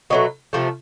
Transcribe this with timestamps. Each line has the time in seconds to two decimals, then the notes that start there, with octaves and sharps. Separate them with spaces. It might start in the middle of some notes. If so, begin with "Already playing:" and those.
0.10 B2 F#3 A3 B3
0.53 C3 F3 A3